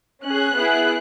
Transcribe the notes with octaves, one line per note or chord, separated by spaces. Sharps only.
C#4 G#4 F#6
B3 E4 G#4